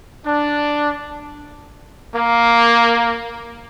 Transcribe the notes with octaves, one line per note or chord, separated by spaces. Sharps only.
D4
A#3